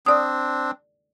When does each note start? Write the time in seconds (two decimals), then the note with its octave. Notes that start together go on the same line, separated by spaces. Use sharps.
0.06 C4 D4 D5 D#6